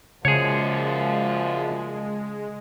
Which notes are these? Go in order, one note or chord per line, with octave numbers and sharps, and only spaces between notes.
F#2 A#2 C#3 F3 G#3 G#4 C#5